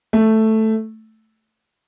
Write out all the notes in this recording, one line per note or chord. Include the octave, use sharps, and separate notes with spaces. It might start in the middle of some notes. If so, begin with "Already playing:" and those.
A3